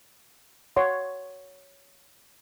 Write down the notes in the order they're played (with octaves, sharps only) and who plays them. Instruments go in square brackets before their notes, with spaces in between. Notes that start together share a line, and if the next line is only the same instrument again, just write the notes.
[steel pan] C#5 F#5 C6